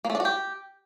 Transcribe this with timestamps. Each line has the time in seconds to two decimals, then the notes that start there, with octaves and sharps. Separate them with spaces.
0.05 A#3
0.10 A3
0.15 D4
0.20 F#4
0.25 G4